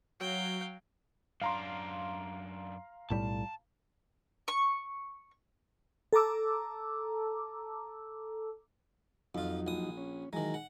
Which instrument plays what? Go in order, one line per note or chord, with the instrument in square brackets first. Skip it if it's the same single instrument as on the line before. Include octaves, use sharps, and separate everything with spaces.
[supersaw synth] F#3 [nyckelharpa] F5 G5
[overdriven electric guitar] F#2 D4 [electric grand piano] F5 A#5 C6
[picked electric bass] B1 A2 G3 [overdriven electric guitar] A5
[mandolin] C#6
[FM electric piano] A4 A5 A#5 D6 E6
[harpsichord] F2 F4 [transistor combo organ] F3 F#3 D#4
[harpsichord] A#1 D#6
[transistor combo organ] C#4
[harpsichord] D#3 G#3 [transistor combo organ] E3 F#3 A#5
[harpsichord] F#5